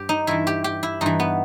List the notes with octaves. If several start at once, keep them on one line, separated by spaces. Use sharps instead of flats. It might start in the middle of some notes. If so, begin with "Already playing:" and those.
Already playing: G2 G4
D#4
G2 E3 E4
G4
G4
E4
G2 E3 D#4
B3